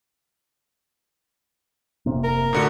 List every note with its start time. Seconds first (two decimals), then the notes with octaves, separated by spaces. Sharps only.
2.06 F1 C3 A#3
2.24 A#4
2.53 A2 D3 F#4